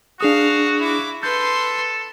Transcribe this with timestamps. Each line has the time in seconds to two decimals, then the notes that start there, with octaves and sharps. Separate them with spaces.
0.21 D4 F#4 G#4 F5 D#6
0.79 E4 D6
1.23 A4 B4 C6 G6